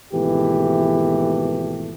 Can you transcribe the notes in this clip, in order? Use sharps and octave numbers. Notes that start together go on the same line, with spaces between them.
G#1 B2 E3 A3 G4